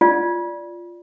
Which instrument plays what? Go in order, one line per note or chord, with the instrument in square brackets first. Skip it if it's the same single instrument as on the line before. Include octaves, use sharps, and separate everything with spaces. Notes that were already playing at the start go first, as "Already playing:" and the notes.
[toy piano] F4 D5